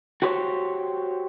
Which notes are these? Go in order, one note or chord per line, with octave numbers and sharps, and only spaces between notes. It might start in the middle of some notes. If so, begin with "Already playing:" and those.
F#4 G4 C5 C#5